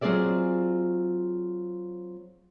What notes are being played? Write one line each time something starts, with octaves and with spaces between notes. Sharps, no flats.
F#3 C4 F4 G#4 D5 E5